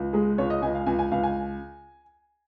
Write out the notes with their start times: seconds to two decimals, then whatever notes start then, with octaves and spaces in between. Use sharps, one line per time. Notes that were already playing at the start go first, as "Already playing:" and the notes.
Already playing: C#2
0.13 G#3 G#4
0.38 C#2 C#5
0.50 D#5
0.62 C#2 G#5
0.75 F5
0.86 C#2 G#5
0.99 G#5
1.12 C#2 F5
1.23 G#5